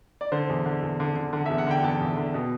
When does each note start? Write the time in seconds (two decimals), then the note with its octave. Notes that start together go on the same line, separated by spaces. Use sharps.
0.21 D5
0.32 D3 C5
0.49 E2
0.66 D3
0.82 E2
1.00 D3
1.16 D3
1.33 D3 F#5
1.46 E5
1.50 E2
1.58 F#5
1.67 D3 G5
1.83 E2 A5
2.00 E2
2.17 D3
2.34 B2